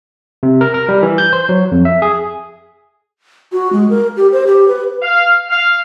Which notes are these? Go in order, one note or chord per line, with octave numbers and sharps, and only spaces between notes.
C3
A#4
A#4
G3
E3
G6
C5
F#3
F2
E5
G#4
F#4
G#3
A#4
G4
C5
G4
B4
F5
F5